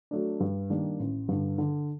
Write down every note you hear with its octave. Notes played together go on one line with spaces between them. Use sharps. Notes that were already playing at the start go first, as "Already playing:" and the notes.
F#3 A3 D4
G2
D#3 G3 A#3 D4
A1
G2 D3
D3